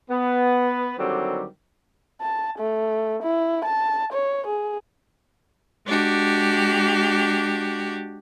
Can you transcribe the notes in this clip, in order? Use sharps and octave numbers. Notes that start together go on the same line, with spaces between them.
B3
D3 D#3 F#3 G3 C4 G4
A5
A3
E4
A5
C#5
G#4
G#3 D4 F#4 G4